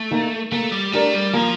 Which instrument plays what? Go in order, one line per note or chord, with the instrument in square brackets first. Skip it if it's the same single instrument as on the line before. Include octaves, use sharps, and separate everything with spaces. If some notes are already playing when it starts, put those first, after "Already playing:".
Already playing: [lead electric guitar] A3
[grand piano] D#3 A#3
[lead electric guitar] A3 [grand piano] A#3
[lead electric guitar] G3
[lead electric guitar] A3 [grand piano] D4 G4 A#4 D5
[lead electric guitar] G3
[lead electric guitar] F3 [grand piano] A#3